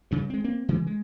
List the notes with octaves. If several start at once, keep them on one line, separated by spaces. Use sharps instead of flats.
G2 C#3 G3
G#3 C4
A#3 C4
C#3 E3 G#3
G#3